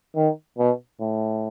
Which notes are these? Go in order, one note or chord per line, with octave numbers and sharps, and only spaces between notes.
D#3
B2
A2